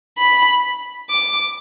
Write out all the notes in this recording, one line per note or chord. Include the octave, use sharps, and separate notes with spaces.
B5
D6